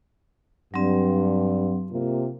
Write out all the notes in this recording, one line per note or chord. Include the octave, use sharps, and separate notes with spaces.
G2 F#3 C4
C3 A#3 F4